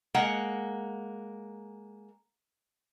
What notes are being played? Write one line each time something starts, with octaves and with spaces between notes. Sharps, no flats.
G#3 A#3 F#5